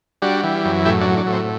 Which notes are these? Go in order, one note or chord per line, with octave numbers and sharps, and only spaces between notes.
G3 D4 F#4
E3
F#2
A2 E4 G4
D4 F#4
F#3
D4
A2
C4